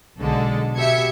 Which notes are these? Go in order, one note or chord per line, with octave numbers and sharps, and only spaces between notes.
B1 D3 G#3 A4
B2 G4 E5 G#6 C#7